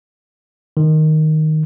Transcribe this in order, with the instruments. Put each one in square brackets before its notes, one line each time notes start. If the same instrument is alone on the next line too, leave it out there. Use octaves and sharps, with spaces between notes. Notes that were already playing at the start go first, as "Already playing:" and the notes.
[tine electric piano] D#3